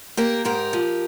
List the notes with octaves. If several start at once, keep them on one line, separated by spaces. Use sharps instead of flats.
A#3 G4 A#4
G#2 G4 A#4
F3